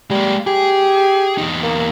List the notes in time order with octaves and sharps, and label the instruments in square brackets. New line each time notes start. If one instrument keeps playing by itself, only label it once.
[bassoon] G3 [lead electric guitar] G#3 A#3
[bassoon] G4 [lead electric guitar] G#4
[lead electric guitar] E2 D#4
[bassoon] A#3